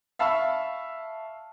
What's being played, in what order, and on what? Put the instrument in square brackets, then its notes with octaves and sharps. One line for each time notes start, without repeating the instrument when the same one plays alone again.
[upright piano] E5 F5 A5 B5 C#6 E6